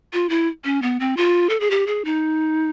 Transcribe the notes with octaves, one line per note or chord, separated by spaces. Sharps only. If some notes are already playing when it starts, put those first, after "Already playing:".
F4
E4
C#4
B3
C4
F4
A4
G#4
G4
G#4
D#4